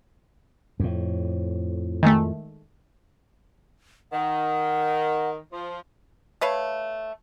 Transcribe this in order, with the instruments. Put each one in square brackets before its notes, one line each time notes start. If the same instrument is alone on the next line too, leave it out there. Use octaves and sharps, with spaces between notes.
[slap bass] F2 A2
[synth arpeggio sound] D#3 G#3 A3
[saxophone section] D#3 [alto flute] F#5
[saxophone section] F3
[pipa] A3 B4 C#5 F5